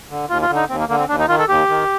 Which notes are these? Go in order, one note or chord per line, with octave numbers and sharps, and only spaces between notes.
D3
D#2 F4
F4
D3
D#4
D#2 C4
A#3
D3 A#3
C4
D#2 D4
D#4
D#3 F4
A4
D#2 G4
D#3